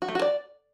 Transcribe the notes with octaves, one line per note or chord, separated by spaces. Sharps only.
F#4
A3
F#4
D5